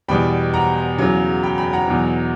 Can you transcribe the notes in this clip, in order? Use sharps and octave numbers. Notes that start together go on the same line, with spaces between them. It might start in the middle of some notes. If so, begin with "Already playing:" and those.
E2 B2 G3 G5 B5
F#5 A#5
E2 C#3 F#3
G5 B5
G5 B5
F#5 A#5
E2 B2 F#3